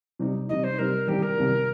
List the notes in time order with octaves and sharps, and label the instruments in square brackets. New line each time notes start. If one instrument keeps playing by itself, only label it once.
[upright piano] C3 G3 D#4
[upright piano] C3 G3 D#4 [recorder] D#5
[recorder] C5
[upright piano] C3 G3 D#4 [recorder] A#4
[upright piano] C2 C3 D#3 G3 [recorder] G4
[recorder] A#4
[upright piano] C2 C3 D#3 G3